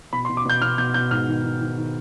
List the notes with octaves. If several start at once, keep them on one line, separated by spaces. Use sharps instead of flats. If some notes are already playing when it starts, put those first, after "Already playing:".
B2 B5
C6
B2
D6
B2 G6
B2 F6
B2 G6
B2 G6
G#2 F6
D#3
D#3
D#3
D#3